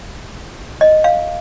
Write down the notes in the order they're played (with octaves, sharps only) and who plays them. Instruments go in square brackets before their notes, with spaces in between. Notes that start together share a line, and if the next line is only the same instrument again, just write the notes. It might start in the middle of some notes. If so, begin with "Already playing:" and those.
[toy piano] D#5
F5